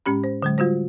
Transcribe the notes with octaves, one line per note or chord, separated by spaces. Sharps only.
A2 G#3 C#4 G4 B5
C5
D3 F#3 G#3
G3 F4 F#4 C5